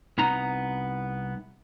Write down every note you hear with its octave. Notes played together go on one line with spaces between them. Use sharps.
C2 B3 D#4 A#5